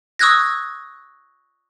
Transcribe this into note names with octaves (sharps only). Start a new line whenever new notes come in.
C#6 D#6 E6 F#6 G#6 A#6